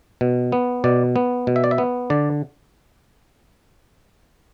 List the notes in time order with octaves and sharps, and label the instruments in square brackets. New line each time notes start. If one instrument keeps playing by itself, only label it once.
[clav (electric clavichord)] B2
B3
B2 D5
B3
B2
E5
D5
E5
B3
D3 D5